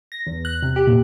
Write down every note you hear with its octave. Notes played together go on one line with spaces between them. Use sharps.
A#6
E2
F#6
C3
G4
A#2